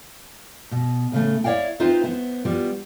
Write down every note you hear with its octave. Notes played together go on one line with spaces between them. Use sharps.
B2
A2 C#3 A3
E4 C#5 D5 F5 G5
C4 D#4 F4 B4 C5 E5
B3 C5
G3 B3 F4 F#4